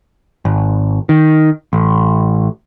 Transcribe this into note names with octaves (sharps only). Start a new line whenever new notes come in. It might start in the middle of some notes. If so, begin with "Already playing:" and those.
G#1
D#3
A1